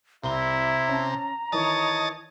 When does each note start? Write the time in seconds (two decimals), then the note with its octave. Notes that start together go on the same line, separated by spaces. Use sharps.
0.24 C2 C3 E4 A#5 G7
0.88 C#4 A5
1.52 D#3 E3 C#5 D#5 A5